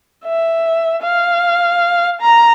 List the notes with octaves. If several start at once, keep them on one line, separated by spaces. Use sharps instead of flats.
E5
F5
A#5